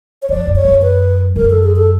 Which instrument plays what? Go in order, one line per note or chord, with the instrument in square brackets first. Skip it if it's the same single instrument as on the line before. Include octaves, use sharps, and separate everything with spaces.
[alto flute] C#5
[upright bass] F2 [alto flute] D5
[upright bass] F#2
[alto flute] C#5
[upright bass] F#2
[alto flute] B4
[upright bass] F#2 [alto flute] A#4
[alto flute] A4
G#4
A4